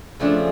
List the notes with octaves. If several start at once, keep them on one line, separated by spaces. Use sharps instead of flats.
C#3 F3 A3 D4